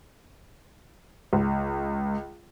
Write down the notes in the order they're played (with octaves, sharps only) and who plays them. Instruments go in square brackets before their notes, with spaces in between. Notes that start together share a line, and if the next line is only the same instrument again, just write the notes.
[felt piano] C#2